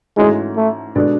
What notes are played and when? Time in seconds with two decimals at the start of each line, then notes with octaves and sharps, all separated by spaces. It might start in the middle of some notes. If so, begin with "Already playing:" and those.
0.17 G#2 E3 G#3 A3 C#4 F#4
0.56 A3
0.95 B2 G#3 D4 A4 D5